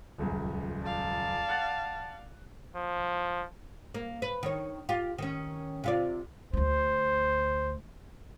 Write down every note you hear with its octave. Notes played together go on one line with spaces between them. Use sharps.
D#1 C#2 F#2
D5 F5 A5
F#5 F#6 A6
F3
A#3
B4
D#3 C#5
F4 G4
D#3 C#4
C3 F4 D5
D2 A3 C5